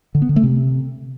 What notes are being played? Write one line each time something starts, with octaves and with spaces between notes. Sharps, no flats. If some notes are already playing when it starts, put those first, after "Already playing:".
D3
B3
D3
A3
C3